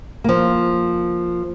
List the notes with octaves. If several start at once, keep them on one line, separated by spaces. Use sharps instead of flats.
F3 A#3